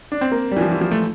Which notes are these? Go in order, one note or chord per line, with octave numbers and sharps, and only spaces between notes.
D4
C4
A#3
G3
E3
F3
E3
F3
A3